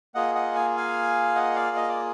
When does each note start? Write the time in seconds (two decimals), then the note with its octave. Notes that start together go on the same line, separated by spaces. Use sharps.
0.15 A#3 F4 G#4 D#5 F#5
0.35 D#5 F#5
0.55 G#5
0.77 F5 G#5
1.35 D#5 F#5
1.56 D5 F5
1.77 D#5
1.89 D5